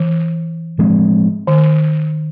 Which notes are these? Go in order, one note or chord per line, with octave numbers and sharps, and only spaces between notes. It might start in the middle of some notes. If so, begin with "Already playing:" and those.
Already playing: E3
A2 F3 G#3 C4
D#3